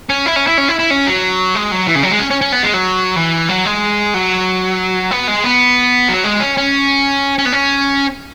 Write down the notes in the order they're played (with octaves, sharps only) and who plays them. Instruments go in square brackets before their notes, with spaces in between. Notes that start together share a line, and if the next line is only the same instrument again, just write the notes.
[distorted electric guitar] C#4
E4
C#4
E4
C#4
E4
E4
C#4
F#3
G#3
F#3
E3
C#3
F#3
G#3
C#4
C#4
C#4
B3
G#3
F#3
E3
F#3
G#3
F#3
B3
G#3
B3
F#3
G#3
C#4
C#4
C#4
B3
C#4